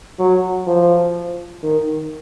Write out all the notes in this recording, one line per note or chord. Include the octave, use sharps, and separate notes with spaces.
F#3
F3
D#3